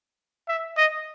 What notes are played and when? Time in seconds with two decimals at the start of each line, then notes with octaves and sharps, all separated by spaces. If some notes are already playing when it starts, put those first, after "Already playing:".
0.48 E5
0.77 D#5